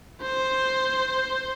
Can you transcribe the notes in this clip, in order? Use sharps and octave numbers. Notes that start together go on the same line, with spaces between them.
C5